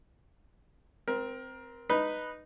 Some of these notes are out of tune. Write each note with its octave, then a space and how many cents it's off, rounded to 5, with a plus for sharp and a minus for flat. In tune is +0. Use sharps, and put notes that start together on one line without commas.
C4 -10 A#4 +20
D#4 -10 B4 +0